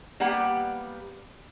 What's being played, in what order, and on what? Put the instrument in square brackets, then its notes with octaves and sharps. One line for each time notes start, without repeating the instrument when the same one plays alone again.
[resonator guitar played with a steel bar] G3 A#3 B3 G4 F#5